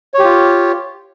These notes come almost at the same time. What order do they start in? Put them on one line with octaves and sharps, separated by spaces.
C#5 G4 F4